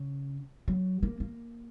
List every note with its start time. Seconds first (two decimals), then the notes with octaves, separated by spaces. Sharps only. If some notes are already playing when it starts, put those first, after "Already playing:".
Already playing: C#3
0.68 F#3
1.03 A#3
1.20 A#3